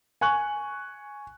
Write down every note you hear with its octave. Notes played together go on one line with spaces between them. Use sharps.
G#5 C#6 F#6 F#7